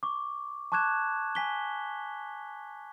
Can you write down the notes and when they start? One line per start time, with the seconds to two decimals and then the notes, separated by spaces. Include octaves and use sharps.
0.03 C#6 D6
0.72 A5 C#6 D6 F#6 G#6 E7
1.35 G#5 B6 G7